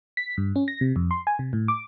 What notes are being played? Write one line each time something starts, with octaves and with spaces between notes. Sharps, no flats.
B6
G2
C#4
A#6
C3
F2
C6
G#5
C3
A2
D6